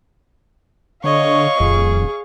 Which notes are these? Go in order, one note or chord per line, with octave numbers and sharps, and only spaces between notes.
D3 C#5 D#5 F5 C#6
D#1 F2 G#4